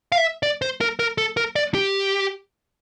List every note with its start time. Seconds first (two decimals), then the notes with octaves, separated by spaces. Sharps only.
0.12 F5
0.18 E5
0.43 D5
0.62 C5
0.81 A#4
0.99 A#4
1.18 A4
1.37 A#4
1.56 D5
1.74 G4